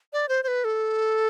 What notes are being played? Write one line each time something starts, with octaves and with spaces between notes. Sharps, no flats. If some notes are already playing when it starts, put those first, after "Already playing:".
D5
C5
C5
B4
A4